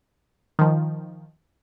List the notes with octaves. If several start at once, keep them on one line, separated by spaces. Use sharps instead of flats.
D#3 F3